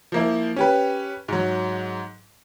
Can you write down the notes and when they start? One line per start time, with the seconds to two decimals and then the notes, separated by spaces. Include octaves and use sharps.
0.12 F3 A#3 E4
0.56 C#4 G4 B4
1.28 G#2 F#3